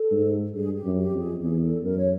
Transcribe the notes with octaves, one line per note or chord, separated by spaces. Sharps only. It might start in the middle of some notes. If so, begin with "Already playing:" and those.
Already playing: A4
G#2
G2 G#4
G4
F#2
G4
F2
G#4
E2 G#4
A4
F#2 A#4
C#5